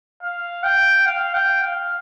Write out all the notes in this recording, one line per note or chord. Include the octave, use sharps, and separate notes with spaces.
F5
G5
F5
G5
F5